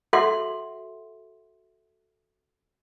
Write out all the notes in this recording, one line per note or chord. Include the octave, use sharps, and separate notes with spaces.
F#4 A4 E5 F#5 C6